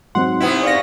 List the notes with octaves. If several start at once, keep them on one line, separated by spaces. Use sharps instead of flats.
G#2 F#3 C4 D#4 F#5 C6
C3 B3 E4
D5 F5 C#6 A#6